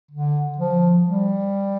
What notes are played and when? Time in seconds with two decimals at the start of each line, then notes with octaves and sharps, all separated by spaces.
0.11 D3
0.58 F3
1.04 G3